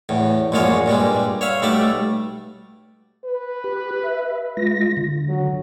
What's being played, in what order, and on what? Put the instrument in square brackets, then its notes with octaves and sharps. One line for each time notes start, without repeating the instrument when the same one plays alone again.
[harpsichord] E2 A2
A#1 F#2 A#2 G#3 F4 C#5
G2 A#2 G3 G#3
C#5 E5 F5
B1 G3 A3 D5 E5
[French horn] B4
[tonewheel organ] G4
E5
G#3 F4 A#6
D3
[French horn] F#3